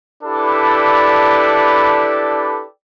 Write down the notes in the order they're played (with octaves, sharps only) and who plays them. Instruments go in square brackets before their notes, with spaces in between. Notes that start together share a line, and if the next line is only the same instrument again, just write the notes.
[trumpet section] D4 E4 G4 A4 B4 D5